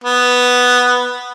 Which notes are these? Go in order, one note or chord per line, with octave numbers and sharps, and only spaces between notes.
B3